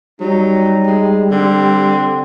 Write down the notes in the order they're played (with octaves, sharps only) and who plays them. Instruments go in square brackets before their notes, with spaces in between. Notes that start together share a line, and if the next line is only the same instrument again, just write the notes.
[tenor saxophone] F#3 [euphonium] G3 [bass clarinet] D#4
[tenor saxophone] G#3
[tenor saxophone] D3 [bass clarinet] C4